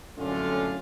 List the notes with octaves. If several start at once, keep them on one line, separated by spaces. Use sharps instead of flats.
C2 F#2 A2 D3 C#4 F4